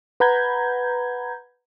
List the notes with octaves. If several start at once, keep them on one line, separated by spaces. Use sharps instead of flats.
B4 F#5 A#5 B5 G6 G#6